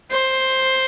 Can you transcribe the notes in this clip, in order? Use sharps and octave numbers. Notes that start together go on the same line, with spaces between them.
C5